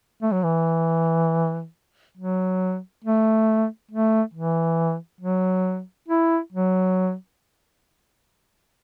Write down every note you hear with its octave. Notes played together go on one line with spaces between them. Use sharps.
A3
F#3
E3
F#3
A3
A3
E3
F#3
E4
F#3